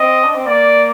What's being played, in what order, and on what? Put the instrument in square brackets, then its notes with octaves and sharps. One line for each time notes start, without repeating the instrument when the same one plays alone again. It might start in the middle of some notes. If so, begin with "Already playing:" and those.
Already playing: [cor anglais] C4 [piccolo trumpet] D#5
[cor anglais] D4
C4
[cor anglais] A#3 [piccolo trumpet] D5